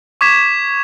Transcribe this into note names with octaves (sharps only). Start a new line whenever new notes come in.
C#6 D6 G#6 B6 E7